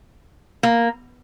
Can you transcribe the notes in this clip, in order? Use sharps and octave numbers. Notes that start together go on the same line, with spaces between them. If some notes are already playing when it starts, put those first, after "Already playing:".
A#3